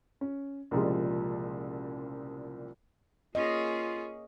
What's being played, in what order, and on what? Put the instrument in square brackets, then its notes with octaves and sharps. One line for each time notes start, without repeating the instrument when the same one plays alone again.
[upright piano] C#4
C2 A#2 C#3 F3 G3 G#3
[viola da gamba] A#3 C#4 G#4 [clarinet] F4 [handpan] D#5